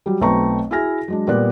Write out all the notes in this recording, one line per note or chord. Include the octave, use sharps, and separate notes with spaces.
F#3 G3
B1 A3 C4 B4 A#5 C#6
E4 F#4 G#4 G#5 F6 A#6
F#3 G#3 D4
A#2 G3 B3 D5 F#6